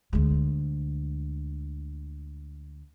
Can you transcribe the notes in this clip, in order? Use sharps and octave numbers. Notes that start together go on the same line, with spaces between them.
D2 G#3